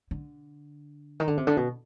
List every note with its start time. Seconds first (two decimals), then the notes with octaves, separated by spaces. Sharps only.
0.11 D3
1.20 D#3
1.27 D3
1.37 C3
1.47 D3
1.57 B2